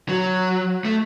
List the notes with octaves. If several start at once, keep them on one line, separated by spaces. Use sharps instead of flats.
F#3
A3